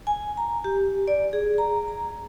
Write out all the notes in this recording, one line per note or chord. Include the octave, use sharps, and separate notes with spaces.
G#5
A#5
G4
D5
G#4
A#5
A#5